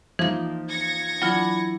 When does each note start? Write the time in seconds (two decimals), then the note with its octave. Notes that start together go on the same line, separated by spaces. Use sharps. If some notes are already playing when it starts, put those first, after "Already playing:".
0.19 E3 F3 A#3 D#4
0.68 G#6 A#6 C#7
1.22 E3 F#3 D4 E4 F4